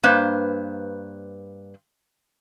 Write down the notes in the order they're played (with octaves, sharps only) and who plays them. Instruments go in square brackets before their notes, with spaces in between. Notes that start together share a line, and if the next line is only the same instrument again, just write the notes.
[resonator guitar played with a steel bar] G2 A#3 B4 C5